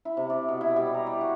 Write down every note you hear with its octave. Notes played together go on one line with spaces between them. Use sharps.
E4
C3
D5
B2
E4
G3
A#5
D5
F#4